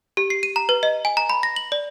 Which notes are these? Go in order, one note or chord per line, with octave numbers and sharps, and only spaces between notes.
G4
C7
D#7
A#5
B4
D#5
G#5
A#5
B5
A#6
F#7
D5